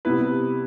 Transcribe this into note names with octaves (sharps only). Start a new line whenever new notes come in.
C3 G3 B3 E4 B4